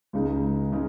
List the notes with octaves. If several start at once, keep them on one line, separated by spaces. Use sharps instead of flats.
C#2 C#3 G#3 D#4
C#3 G#3 D#4